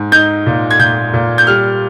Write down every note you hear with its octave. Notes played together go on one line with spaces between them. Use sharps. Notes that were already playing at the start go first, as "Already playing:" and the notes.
Already playing: G#2
D#4 G6
A#2
G#6
A#2 G6
A#2
G6
G3 F6